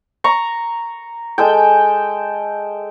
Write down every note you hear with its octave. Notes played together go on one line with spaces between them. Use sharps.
A#5 C#6
G#3 A4 G5